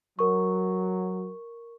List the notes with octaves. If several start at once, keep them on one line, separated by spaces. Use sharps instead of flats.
F#3 A#4 C#6